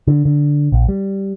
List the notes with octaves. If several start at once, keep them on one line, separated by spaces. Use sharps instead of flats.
D3
D3
A#1
G3